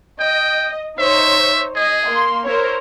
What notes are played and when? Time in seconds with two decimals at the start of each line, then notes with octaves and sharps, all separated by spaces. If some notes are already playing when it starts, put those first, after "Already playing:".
0.20 D#5 G5
0.99 D#4 C5 C#5 E5
1.76 G#4 D#5
2.05 A#3 C6
2.46 E4 A#4 C5 C#5